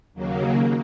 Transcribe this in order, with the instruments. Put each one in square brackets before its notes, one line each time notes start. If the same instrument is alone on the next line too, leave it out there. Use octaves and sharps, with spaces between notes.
[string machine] D#2 C#3 F#3 A#3